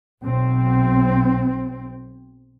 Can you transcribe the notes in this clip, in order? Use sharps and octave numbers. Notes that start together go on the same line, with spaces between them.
B1 C4